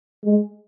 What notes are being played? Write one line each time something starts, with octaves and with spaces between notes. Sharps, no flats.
G#3